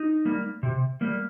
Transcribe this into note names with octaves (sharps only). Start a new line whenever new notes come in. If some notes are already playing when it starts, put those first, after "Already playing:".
Already playing: D#4
G3 A#3
C3
G3 A#3